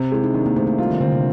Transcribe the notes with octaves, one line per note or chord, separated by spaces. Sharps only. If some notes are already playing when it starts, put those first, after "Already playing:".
Already playing: C3
G#3 E4
D#4
D#3 D4
A#3
C3 A3
A3
G3 F4
D#3
D3 C4
C3